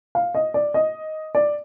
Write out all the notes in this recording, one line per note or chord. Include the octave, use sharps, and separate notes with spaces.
F5
D#5
D5
D#5
D5